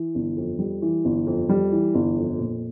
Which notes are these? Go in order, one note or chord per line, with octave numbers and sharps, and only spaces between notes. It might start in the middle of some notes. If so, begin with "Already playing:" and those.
Already playing: E3
G1
F2
G3
E3
G1
F2
G3
E3
G1
F2
A#2